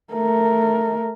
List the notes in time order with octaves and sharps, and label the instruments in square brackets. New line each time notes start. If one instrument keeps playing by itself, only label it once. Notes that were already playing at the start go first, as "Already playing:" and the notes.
[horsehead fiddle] A3 A#4